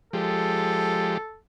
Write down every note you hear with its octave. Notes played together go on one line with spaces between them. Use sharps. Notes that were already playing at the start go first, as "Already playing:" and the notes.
F3 G#3 G4 A4